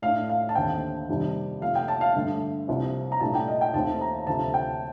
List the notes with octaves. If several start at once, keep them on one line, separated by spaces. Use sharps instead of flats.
A2 A3 D4 F5
F5
A5
D#2 D3 A3 C4 G5
F2 C3 D#3 G3 D4
C3 F3 A3 F5
G5
A5
F5
G2 D3 A3
C2 C3 F3 C4
A#5
C2 A#2 A3 D4 A5
G5
D#5
G5
D#2 D#3 A3 C4 A5
A#5
D2 C3 F3 A3 A5
G5